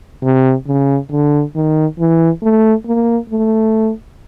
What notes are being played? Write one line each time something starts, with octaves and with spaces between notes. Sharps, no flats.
C3
C#3
D3
D#3
E3
A3
A#3
A3